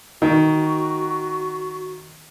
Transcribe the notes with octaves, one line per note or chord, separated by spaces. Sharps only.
D#3 F#4